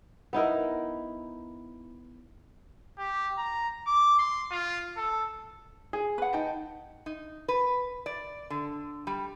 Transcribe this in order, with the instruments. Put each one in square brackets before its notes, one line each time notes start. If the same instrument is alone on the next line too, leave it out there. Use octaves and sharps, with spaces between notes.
[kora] B3 D#4 E4 A#4
[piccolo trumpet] G4
A#5
D6
C6
F4
A4
[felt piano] G#4
[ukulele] B4 F#5
[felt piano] D#4 G5 A5
[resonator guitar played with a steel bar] D#4
B4
D5
D3
G3